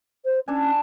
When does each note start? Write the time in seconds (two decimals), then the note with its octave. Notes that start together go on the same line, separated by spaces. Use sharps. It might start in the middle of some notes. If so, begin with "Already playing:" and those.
0.25 C5
0.48 C#4 D4 A4 G#5